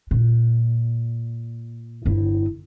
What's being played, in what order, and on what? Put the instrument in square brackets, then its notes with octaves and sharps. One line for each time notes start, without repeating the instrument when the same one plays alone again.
[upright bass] A#2
G1 E4